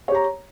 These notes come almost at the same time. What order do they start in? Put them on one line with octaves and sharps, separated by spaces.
C#5 G4 A#5